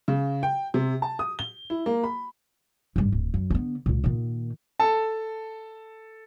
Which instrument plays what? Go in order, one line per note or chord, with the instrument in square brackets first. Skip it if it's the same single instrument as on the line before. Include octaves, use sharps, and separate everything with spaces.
[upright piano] C#3
G5
C3
A5
D#6
G7
E4
A#3
B5
[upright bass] G#1 G2
D1
F#2
D3 B3
C#2 A#2
A#2 D#3
[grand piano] A4 A5